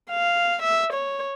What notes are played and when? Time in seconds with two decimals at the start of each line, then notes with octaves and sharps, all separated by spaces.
0.11 F5
0.62 E5
0.93 C#5